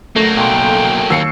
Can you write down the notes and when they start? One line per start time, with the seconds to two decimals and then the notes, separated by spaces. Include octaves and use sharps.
0.16 F#3 A3 A#3 A#6
0.37 B1 G5 C6
1.10 D#2 E6 C7 C#7